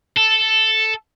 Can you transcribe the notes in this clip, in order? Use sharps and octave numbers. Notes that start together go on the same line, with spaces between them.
A4